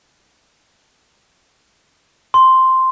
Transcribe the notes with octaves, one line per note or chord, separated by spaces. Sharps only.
C6